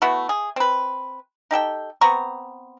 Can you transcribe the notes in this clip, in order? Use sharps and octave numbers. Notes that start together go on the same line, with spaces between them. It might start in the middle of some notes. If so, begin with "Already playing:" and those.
A3 B3 E4 F#4
G#4
C4 B4
D#4 G4 A4 G5
B3 C4 A#5 C#6